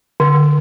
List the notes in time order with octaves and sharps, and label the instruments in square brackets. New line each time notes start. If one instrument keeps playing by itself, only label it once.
[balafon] D3